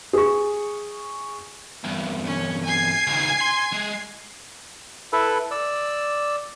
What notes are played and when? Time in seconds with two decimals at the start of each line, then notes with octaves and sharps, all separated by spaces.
0.13 G#4 C#6
1.84 E2 G2
2.25 C#4
2.65 G#5 G#6 C7
3.07 C#2 D#3
3.41 C6
3.73 G#3
5.13 E4 A4 B4
5.51 D5 E6